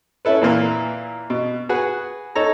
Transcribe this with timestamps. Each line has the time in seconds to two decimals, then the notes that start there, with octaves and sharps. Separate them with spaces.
0.25 C#4 E4 A4 B4
0.41 A#2 E3 A#3
1.30 B2
1.69 F#4 G#4 B4 F#5
2.35 D#4 A4 C#5 A#5